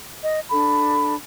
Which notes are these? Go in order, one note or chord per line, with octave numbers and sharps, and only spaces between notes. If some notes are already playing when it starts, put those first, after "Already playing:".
D#5
D4 A4 B5